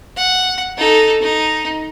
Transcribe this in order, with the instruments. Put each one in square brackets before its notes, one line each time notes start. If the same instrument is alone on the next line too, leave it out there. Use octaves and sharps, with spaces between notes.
[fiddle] F#5
D#4 A4
D#4